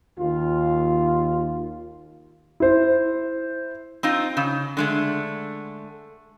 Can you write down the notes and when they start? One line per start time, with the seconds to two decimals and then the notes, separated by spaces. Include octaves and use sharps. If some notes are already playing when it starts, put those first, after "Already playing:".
0.19 D#2 F4
2.60 E4 C5
4.03 C4 D#4 F4
4.37 C#3
4.77 D3 G#3 A3